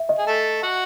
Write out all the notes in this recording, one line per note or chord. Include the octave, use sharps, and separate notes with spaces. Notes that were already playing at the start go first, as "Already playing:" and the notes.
Already playing: E5
D#5
G#4
A3 A4
F#4 F#5